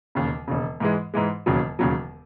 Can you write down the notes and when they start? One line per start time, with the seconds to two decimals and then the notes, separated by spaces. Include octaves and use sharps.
0.15 E1 D#2 C#3
0.48 E1 D#2 C#3
0.80 G#2 E3 G#3
1.14 G#2 E3 G#3
1.46 E1 D#2 C#3 F#3
1.79 E1 D#2 C#3 F#3